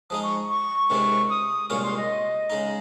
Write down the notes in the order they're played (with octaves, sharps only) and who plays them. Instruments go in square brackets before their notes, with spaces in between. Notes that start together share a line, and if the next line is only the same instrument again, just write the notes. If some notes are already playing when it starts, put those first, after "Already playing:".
[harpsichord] F3 G#3 D#4 [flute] D#6
[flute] C#6
C#6
[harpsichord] C#2 C3 D#3 G#3 C4
[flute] D#6
[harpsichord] C2 A#2 G#3 C#4 F4 [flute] C#6
[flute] C6
D#5
[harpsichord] C#3 G#3 D#4